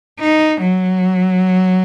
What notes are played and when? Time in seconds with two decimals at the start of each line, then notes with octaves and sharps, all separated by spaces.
0.20 D#4
0.62 F#3